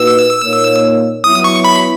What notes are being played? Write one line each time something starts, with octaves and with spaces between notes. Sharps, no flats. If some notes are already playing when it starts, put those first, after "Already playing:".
Already playing: A#2 A#3 D#4 F#4 B4 E6
A#2 A#3 D#4 A#4 C#5
F#3 B3 E4 D#6
C#6
B5